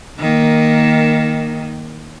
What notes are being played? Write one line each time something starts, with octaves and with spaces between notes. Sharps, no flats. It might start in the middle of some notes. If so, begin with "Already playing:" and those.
D#3 A#3